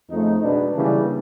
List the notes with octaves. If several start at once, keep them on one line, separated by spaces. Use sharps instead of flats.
F2 C#3 F3 A3 D#4
B2 G#3 B3 D4
C#3 E3 G3 A#3